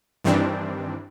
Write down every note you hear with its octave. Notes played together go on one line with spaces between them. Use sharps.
G2 D#3 E3 G3 C4 D4